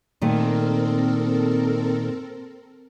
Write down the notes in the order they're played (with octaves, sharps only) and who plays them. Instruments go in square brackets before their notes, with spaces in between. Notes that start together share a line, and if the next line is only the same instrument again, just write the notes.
[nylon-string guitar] A#2 D#3 A3 [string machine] C4 A4 A#4